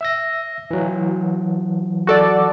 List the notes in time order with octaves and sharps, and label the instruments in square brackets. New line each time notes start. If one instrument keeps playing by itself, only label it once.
[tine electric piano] E5 E6 A#6
E3 F#3
[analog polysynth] F#4 A4 D5